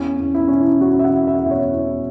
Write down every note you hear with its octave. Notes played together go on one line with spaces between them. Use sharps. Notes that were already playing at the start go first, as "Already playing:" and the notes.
Already playing: E2 C#4
E2
E4
E3 C#4
E4
E3 F#4
E5
F#5
E3
E5
E2 E5
C#5
E2